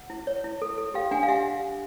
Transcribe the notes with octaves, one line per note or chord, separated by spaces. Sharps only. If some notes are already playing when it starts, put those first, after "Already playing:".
Already playing: F#5
E4
C#5
E4
A4
A4
G4 F5 G5
D4 F#5 G#5
F5
G4 E5 F#5